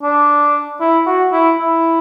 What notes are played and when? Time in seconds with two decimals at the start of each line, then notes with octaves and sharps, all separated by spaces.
0.03 D4
0.80 E4
1.06 F#4
1.32 E4
1.58 E4